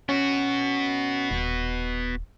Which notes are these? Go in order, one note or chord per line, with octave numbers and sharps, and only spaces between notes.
B3 C#4 F#4
D#1